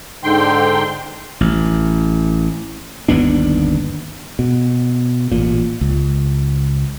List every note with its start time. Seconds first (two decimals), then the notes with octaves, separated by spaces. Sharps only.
0.24 G#2 D3 G5 C6
1.41 A1
3.08 G1 D#2 B3 D4
4.39 B2
5.32 A1 A#2
5.81 C#2